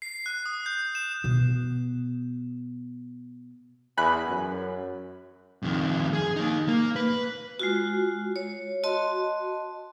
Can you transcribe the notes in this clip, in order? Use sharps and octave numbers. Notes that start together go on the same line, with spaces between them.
C7
F#6
D#6
G6
E7
B2 B3
E2 G#5 B5 F#6
F#2
F2 D#3
G#4
A#3 D#4
A#3
B4
G#3 F4 F#4
C#5
F#4 D#5 A5 C6